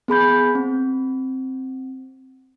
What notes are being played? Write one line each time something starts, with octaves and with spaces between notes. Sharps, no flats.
B3 G#4 B5 G6
C4